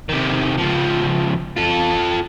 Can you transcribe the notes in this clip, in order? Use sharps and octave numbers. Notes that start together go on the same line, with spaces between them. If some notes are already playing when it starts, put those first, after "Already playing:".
C3 D#3
C#2 F3
F4 A4